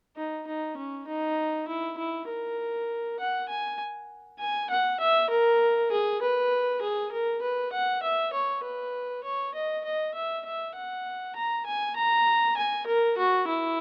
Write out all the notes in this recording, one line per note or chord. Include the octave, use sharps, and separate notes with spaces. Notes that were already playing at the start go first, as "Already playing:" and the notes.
D#4
D#4
C#4
D#4
E4
E4
A#4
F#5
G#5
G#5
F#5
E5
A#4
G#4
B4
G#4
A#4
B4
F#5
E5
C#5
B4
C#5
D#5
D#5
E5
E5
F#5
A#5
G#5
A#5
G#5
A#4
F#4
E4